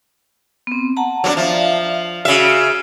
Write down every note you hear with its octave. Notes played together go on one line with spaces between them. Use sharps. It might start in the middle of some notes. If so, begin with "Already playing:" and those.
B3 C4
F#5 A5 A#5
F#3 A#3 D4
F3 D5 E5 F5
C#3 F#4 E5